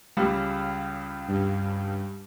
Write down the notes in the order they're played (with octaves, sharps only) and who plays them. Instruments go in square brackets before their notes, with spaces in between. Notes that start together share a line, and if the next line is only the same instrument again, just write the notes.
[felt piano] C#2 C#3 G3
[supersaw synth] G2